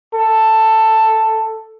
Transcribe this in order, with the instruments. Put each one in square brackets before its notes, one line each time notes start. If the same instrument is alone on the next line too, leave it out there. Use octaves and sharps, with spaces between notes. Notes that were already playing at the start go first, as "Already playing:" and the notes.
[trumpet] A4